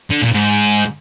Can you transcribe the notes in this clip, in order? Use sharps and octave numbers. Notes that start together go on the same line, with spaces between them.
D3
A#2
G#2